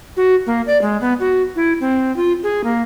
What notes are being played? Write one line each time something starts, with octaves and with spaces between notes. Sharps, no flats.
F#4
A#3
D5
G#3
B3
F#4
E4
C4
F4
G#4
A#3